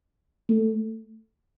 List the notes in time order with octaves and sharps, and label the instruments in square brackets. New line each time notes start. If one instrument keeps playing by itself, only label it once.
[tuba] A3